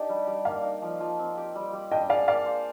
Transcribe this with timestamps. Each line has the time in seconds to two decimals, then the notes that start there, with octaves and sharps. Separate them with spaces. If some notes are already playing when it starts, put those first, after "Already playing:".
Already playing: D4 D#4 G4
0.09 G3
0.27 G3
0.45 A#3 D5 F5
0.63 D#4
0.82 F3
1.00 F3
1.19 C4
1.37 G4
1.55 G3
1.73 G3
1.91 D4 D#5 G5
2.09 G#4 D5 F5
2.27 A#3 D5 F5
2.46 C5